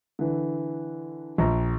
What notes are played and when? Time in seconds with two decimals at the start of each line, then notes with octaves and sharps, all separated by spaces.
0.19 D3 E3
1.38 A#1 A#5